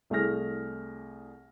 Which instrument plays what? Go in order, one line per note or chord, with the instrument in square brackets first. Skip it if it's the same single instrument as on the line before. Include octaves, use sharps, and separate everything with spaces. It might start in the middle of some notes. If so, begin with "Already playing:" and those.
[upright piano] C2 A3 E4 G#4 F6 A#6